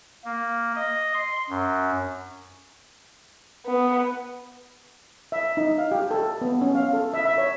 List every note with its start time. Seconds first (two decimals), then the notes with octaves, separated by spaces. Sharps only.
0.25 A#3
0.75 D#5
1.14 C6
1.50 F#2
3.66 B3
5.32 E5
5.57 D#4
5.78 F5
5.92 G4
6.11 A4
6.41 B3
6.61 C#4
6.75 F5
6.93 A4
7.14 E5
7.25 E5
7.38 C#5